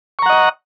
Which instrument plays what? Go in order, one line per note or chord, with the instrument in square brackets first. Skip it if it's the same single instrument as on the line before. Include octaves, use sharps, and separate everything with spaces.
[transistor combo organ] C#6
A#5
F#5
D#5